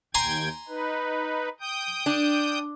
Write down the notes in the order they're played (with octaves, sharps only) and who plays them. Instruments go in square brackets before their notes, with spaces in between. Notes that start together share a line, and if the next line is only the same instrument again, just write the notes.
[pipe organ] D#2 G5 G#6 [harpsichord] G#5 A#5 C6
[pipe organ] D#4 B4
G5 D#6 G6
[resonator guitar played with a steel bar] D4